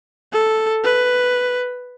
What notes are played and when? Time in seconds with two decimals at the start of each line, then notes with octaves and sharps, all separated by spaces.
0.33 A4
0.84 B4